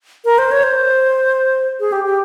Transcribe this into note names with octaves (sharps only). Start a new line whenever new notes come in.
A#4
C5
C#5
C5
G#4
G4
G4